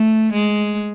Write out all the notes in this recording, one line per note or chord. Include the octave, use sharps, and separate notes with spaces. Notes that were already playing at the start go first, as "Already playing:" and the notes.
Already playing: A3
G#3